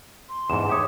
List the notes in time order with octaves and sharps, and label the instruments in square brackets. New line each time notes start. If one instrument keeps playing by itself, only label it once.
[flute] C6
[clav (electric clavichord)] E2 G#2 [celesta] E7
[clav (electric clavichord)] G4 C#5 [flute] E5 [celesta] D6 D#6